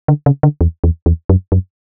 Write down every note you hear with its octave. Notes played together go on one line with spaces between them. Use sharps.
D3
C#3
D3
E2
E2
E2
F#2
F#2